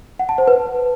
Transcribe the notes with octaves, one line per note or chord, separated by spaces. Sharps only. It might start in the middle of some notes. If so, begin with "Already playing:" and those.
F#5
A5
C5
B4